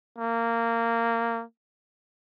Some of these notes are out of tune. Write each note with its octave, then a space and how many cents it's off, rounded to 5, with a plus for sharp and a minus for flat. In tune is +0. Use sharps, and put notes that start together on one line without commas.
A#3 -15